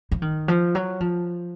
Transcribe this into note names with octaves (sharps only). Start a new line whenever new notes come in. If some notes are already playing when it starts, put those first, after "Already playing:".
F3
D#3
F3
F#3
F3